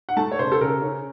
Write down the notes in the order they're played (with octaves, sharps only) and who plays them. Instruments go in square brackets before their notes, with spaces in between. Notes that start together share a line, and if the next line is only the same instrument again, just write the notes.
[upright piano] F#5
A3 A5
C#5
C#3 C5
A4
C#3 A#4
C#4